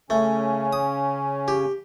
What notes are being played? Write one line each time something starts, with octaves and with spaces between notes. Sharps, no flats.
C#3 A3 C#4
D#6
G4